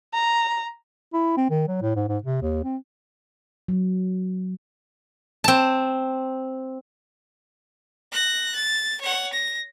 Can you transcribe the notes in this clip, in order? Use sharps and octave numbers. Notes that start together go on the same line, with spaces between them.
A#5
E4
C4
D#3
F#3
A2
G#2
G#2
C3
D#2
C4
F#3
C4 A5
F#6 A#6
A6
C#5 F#5
A#6